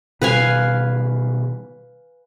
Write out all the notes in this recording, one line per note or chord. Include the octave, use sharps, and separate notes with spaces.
B2 D#3 G3 B4 F5 G#5